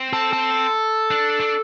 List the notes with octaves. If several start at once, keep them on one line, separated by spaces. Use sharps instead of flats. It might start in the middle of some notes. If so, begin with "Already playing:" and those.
Already playing: C4
A4
A4
D4
D4